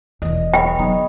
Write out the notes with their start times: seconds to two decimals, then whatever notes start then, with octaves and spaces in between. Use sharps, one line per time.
0.22 E1 E2 D#5
0.54 G#4 B4 C#5 G5
0.75 D3 F#3 B3 D#4